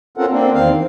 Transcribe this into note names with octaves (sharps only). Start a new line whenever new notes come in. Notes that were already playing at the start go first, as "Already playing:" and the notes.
C4 C#4 F4 A4 A#4 F#5
A#3 C4 D4
E2 D#3 C4 F5
E3